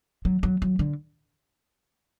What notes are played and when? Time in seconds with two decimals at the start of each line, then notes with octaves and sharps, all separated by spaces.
0.25 F#3
0.43 F#3
0.62 F#3
0.79 D3